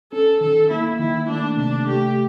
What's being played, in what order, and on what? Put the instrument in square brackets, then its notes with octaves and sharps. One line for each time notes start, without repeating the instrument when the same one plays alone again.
[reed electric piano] C#4 [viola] A4
[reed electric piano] D#3 [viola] A4
[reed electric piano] A#3 [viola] E4
[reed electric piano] D#3 [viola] E4
[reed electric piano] A3 [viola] D4
[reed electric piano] C3 [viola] D4
[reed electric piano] A3 [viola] G4